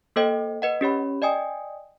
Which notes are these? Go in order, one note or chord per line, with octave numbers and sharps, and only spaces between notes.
A#3 A4 C5 D#5 G5
B4 D#5 F#5
C#4 G4 C#5 B5
D5 D#5 G5 G#5 D#6